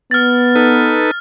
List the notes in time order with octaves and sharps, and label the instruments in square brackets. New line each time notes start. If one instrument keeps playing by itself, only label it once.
[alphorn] B3 [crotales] F6 A6
[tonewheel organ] D#4 A4 B4